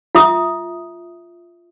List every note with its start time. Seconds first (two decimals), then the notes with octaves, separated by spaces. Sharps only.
0.15 F4 E5 D#6